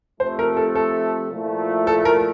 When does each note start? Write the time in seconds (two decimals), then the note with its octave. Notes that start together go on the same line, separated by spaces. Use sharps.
0.20 C3 F3 A3 C5
0.39 A#4
0.57 A4
0.75 A4
1.31 A#2 F3 A3 E4
1.87 A4
2.05 A#4